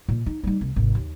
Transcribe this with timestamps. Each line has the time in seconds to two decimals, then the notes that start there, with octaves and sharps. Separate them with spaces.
0.08 A#2
0.26 D#4
0.44 G3 D#4
0.61 C2
0.76 G#1 C3
0.95 D#2